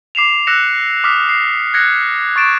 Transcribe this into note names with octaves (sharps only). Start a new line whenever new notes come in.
D6 C7 E7 F7
E6 F#6 A#6 C#7 E7
D6 D#6 F6 B6
C7
F#6 G#6 A#6 C#7
C#6 A6 D7 E7